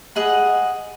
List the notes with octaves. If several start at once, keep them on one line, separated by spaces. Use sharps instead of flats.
G#4 D#5 F#5 B5